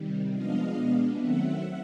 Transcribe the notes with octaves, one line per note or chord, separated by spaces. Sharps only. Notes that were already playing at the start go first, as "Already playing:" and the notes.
Already playing: C3 D#3 G3
F3 G#3 B3 D4 D#5 F5
B2 G#3 B3 D4
D#3 F#3 A3 C4 E5 F#5